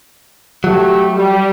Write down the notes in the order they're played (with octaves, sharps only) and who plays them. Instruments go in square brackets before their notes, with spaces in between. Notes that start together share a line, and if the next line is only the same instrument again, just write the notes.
[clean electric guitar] F#3 [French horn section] A3 G4
[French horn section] G3